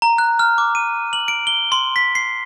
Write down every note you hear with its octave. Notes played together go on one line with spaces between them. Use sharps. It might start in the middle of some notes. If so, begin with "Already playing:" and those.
A#5
F#6
F6
D6
D#7
F#7
D7
G7
C6
B6
C7